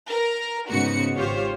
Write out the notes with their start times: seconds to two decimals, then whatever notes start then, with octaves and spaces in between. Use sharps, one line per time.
0.10 A#4
0.70 G#2 C#3 B3 D#4 F#4 C#7
1.16 G#1 F4 G4 C5 C#5